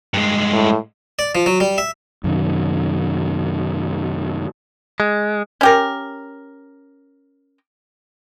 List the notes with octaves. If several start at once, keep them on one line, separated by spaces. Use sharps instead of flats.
G2 G#3
A2
D5
F3
F#3
G3
E5
F#2 C3 D#3
G#3
C#4 G4 A#4